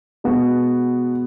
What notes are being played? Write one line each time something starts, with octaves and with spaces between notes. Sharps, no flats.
B2 G#3 B3 F#4